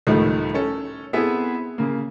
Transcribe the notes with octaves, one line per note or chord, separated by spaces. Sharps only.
C#2 A2 D#3 F3 G3 A3
C#4 A4
B3 C4 E4 G#4 A4 E5
C#3 A#3